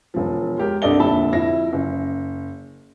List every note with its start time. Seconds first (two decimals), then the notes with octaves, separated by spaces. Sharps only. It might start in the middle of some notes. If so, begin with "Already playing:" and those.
0.14 E1 F3
0.58 G#3 G4 A#4
0.82 C2 G2 A4 D5 D#5 G7
0.99 F1 A#2 D3 E5 A5 B5
1.33 F2 E4 A#6
1.73 F#1